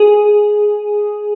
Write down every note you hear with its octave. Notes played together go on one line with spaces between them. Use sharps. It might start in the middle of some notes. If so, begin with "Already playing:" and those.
Already playing: G#4